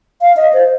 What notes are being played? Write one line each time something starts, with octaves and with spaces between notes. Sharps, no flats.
F5
D#5
C5